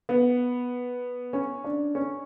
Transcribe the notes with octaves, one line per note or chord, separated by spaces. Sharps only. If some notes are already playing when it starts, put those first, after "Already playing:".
B3
C#4
D4
C#4